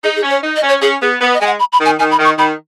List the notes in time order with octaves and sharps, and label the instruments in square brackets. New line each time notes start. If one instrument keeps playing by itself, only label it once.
[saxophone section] D#4 [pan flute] G#4
[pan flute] G#4
[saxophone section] C#4
[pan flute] C#5
[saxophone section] D#4
[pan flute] D#5
[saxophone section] C#4
[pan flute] C#5
[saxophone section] C#4 [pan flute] G#4
[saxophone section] B3 [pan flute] G#4
[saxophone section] B3 [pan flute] B4
[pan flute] D#5
[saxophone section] G#3 [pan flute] G#5
[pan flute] F#5
B5
B5
[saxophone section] D#3
[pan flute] G#5
[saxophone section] D#3 [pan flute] G#5
[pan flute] B5
[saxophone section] D#3
[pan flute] C#6
[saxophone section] D#3 [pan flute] B5